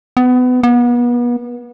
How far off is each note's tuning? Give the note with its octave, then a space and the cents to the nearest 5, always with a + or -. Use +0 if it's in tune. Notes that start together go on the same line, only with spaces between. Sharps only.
B3 +25
B3 -35